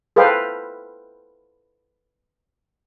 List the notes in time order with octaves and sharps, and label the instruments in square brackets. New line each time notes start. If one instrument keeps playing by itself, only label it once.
[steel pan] A4 B4 C5 F5 G5